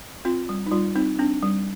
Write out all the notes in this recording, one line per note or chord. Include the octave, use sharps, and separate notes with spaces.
C4 F4
G3
D#4
G3 F4
C4 D#4
C4 D4
G3